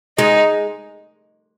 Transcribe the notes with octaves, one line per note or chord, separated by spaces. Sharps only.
G#3 D#4